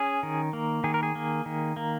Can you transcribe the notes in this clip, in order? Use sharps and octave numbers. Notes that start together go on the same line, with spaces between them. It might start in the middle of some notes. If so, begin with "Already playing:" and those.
Already playing: C#4 G#4
D#3
A#3
D#3 G#4
A#4
G#4
A#3
D#3
A#3